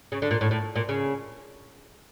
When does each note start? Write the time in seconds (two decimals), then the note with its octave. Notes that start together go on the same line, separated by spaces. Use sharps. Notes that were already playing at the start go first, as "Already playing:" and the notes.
0.12 C#3
0.22 D3
0.31 A#2
0.41 A2
0.51 A2
0.76 A#2
0.89 C#3